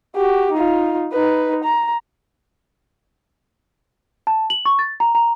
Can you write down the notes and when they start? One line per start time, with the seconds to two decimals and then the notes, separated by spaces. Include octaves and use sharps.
0.15 F#4 G4
0.52 D#4 F4
1.12 D#4 B4
1.64 A#5
4.27 A5
4.50 F#7
4.65 C#6
4.79 A6
5.00 A#5
5.15 A#5